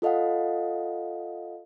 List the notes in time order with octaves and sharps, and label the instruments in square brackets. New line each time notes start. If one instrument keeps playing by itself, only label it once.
[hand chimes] F4 A4 D#5 F5 F#5